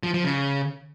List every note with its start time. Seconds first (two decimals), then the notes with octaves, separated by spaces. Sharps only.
0.03 F3
0.14 F3
0.25 C#3